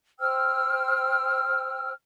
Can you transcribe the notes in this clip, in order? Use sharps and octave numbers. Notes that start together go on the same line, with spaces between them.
C5 G5 E6 F6